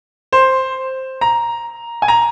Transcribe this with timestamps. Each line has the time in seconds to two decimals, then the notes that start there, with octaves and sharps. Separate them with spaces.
0.32 C5
1.21 A#5
2.02 G#5
2.08 A#5